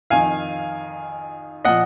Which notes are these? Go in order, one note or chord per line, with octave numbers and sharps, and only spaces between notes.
F2 D#3 F5 G#5
A#2 F3 D#5 F#5